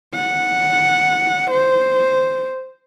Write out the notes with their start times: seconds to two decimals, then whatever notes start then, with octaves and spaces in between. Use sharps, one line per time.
0.14 F#5
1.51 C5